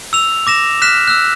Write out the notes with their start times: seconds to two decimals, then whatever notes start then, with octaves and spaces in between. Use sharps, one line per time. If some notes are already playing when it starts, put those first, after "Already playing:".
0.13 E6 F7
0.47 D6 A#6 E7
0.82 F6 F#6 B6 E7
1.08 E6 F#6